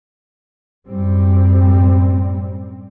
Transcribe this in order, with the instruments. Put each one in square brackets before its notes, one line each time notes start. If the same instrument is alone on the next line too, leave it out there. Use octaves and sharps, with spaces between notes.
[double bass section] F#2 A2 G3 C4